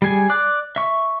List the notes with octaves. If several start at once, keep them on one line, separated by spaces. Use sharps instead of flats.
G3 G#4 G#5
D5 D6 F#6
E5 C#6